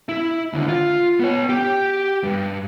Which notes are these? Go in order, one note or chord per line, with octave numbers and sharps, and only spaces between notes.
E4
D#2 D3
F4
B3 C#5
G4 G5
G2